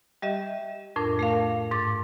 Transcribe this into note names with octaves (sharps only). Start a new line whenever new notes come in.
G3 G4 D#5 E5
F2 A2 D4 A#4
A3 A#4 F5
G#2 D6 A6